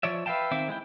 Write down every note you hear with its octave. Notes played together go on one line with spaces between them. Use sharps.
F3 C#5 D5 E5
B4 E5 F5 G5 A5
D#3 C4 C5 E5 D6
G#3 E4 G5